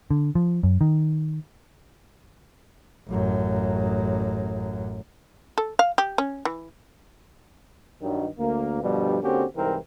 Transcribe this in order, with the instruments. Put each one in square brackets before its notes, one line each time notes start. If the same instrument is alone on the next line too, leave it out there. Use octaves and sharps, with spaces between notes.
[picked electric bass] D3
F3
F#2
D#3
[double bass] A1 F#2
[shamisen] A4
F5
G4
C#4
E3
[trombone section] G2 D#3 F#3
D2 A#3
G2 B2 D3 F3 G3
D3 A#3 C4 C#4 F#4 G4
C2 G#2 E3 C4 A#4